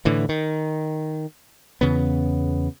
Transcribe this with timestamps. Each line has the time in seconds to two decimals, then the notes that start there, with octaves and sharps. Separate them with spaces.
0.05 A2 D3 E3
0.29 D#3
1.81 E2 C#3 B3